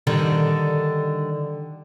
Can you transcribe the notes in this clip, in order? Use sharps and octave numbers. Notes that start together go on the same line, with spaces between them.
D3 D#3 G3